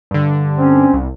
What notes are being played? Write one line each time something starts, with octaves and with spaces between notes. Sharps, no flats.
G2 D3
C4 C#4
C2